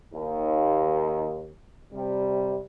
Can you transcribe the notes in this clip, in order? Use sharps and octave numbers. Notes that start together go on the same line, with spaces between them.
D#2
C3 G3